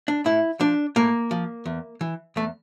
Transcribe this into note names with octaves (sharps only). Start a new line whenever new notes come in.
D4
A2 E4
F3 D4
A2 A#3
F3
E2
E3
E2 A3